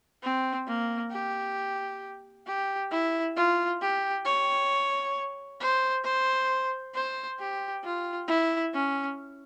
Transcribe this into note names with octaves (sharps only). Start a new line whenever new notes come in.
C4
A#3
G4
G4
E4
F4
G4
C#5
C5
C5
C5
G4
F4
E4
C#4